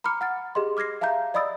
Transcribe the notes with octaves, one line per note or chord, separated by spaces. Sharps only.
A#5 B5 D6 F6 C#7
F#5 F6 A6
G4 G#4 D#5 C6
D6 F6 G#6 A#6 C7
E5 F5 A5 A#5 G6
D5 D#5 B5 D#6 E6 A6